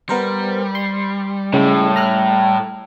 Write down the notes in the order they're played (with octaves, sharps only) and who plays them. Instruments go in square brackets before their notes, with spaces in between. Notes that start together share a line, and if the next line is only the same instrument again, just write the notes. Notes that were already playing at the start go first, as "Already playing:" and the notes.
[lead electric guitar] G3 [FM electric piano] B3 A#4 C5
[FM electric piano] C6
[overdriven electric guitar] A2 [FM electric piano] C#3 G#3
[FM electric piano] A#5 F6 F#6